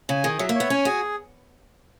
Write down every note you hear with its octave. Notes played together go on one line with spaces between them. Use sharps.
C#3 G#5
D#3 G#4
F#3 E5
A#3
C#5
B3
C#4 G#5
F#4 G#4